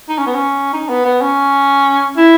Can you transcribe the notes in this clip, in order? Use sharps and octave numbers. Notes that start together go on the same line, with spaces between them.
D#4
C#4
B3
C#4
D#4
B3
B3
C#4
E4